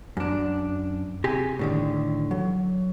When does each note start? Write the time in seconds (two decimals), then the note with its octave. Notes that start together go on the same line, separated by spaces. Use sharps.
0.17 F#2 D4
1.24 C3 G4 G#4 C6
1.59 A2 D3 D#3
2.31 F#3